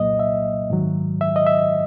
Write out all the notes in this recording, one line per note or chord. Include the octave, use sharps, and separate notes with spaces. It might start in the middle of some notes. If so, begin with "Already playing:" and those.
Already playing: C2 A#2 F#3 A#3 D#5
E5
G#2 D#3 F#3
E5
D#5
E5